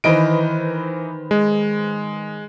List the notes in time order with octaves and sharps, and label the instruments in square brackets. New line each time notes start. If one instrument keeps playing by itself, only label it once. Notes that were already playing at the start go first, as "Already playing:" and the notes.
[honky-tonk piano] D#3 B4 C5 [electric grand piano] E3 D#5 D7
[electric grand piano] G#3